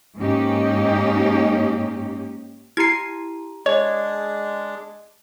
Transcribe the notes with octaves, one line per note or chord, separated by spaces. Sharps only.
G#2 A#3 C#4 D#4 G4
E4 G4 A#5 G#6 C7
G#3 D4 C#5 D#5